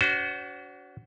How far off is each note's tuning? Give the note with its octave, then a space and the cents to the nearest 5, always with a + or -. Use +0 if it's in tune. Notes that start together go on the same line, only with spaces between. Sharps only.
D4 -45 F#4 +15 C5 -20